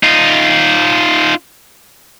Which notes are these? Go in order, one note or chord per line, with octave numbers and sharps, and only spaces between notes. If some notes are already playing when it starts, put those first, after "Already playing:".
D#4 F4